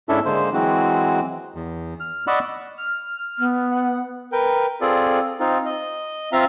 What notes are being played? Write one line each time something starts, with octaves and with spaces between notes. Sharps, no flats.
G#2 C#4 D4 E4 A4 E5
D3 G#3 A#3 C5
E3 F#3 G#3 C4 F#4
E2
F6
D5 D#5 F#5 B5 C#6 E6
F6
B3
F#5
A#4 B4 G5
C4 F4 G#4 A4 D5
C4 D#4 F4
D#5
C4 F4 E5 F5 A#5